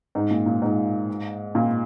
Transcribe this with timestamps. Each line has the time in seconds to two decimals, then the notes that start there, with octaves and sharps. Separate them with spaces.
0.15 G#2
0.31 A#2
0.46 A#2
0.62 G#2
1.55 A#2